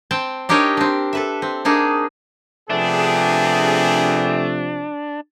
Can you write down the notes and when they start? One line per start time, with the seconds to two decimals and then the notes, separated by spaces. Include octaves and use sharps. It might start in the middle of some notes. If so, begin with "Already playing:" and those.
0.11 C4 G5 A5
0.49 D4 D#4 G4 A#4 C#5 D#5
0.77 C4 D4
1.13 A4 B4 E5
1.42 C4
1.65 A#3 D4 D#4 G#4
2.70 C3 F3 A3 B3 D4 G4 G#4